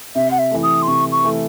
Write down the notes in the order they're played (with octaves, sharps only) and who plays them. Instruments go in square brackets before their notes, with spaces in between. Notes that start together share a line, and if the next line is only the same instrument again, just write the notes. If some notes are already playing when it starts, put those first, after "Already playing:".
[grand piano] C3 [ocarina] E5
[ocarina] F#5
E5
[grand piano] E3 A3
[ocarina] D#6
C6
[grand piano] C3 [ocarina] C#6
[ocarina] C#6
[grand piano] E3 A3